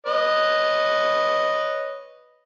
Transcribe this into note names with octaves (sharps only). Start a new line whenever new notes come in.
B4 C#5 D#5